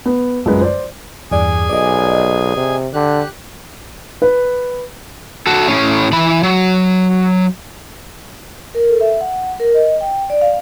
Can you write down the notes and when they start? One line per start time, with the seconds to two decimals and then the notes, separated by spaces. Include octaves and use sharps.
0.05 B3 B4
0.45 A#1 F#2 F3 G#3 B4
0.61 C5 D5
1.31 E2 G2 G#4 D5 G#5
1.70 B1 D5 D#5
2.56 C3
2.93 D3 G4 F#6
4.22 B4
5.47 F#4 A4
5.68 A2 C#4
6.12 E3 B5
6.43 F#3
8.75 A#4
8.89 A4
9.01 E5
9.21 F#5
9.60 A#4
9.74 D#5
10.01 G5
10.30 D5
10.41 F5